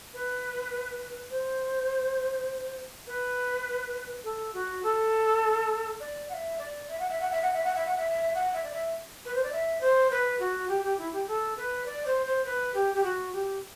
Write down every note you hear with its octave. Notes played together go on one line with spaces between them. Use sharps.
B4
C5
B4
A4
F#4
A4
D5
F#5
E5
D5
E5
F#5
E5
F#5
E5
F#5
E5
F#5
E5
F#5
E5
F#5
E5
D5
E5
B4
C5
D5
E5
C5
B4
F#4
G4
G4
E4
G4
A4
B4
D5
C5
C5
B4
G4
G4
F#4
G4